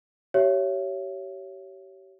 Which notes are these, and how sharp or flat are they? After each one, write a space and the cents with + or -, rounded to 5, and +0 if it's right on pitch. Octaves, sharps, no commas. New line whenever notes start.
G4 -30 C#5 +0 E5 +25